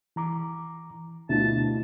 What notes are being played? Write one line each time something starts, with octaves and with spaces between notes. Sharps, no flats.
E3 A#5 D6
D2 B2 E4 F4 A5